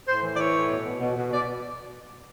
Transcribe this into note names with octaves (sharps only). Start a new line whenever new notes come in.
A2 C5
E3
D5
E3 C#5
A2
B2
B2
B2
B2
B2 D5